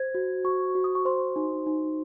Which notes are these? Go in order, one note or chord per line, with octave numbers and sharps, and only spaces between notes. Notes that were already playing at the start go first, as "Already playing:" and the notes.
Already playing: C5 G#6
F#4
F#4 C#6
F#4
D#6
C#6
C5 C6
D#4
D#4